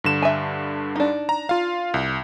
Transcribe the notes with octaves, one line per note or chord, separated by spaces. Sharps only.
G2 D3 E7
E5 G#5
D4 D#4
A#5
F4 F5
C2